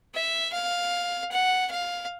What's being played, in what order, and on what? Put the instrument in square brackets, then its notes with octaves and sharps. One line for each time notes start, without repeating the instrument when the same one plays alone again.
[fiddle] E5
F5
F#5
F5